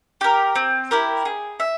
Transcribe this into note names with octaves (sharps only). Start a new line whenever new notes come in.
G4 A#4
C4
E4 G4 A#4
G#4
E5